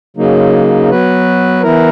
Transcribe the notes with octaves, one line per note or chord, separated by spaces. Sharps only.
C#3 F#3 A#3 D#4
F#3 B3 F#4 B4
E3 B3 E4 A#4